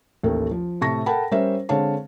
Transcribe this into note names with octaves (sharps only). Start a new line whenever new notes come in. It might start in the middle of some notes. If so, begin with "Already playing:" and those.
A1 D#2 A3 A#4
F3
A2 C3 A5 C#6 A#6
A4 A#4 F#5 G5 A5 B5
G3 C#4 A#4 C5 E5
D3 G#3 C4 C#5 F5 A5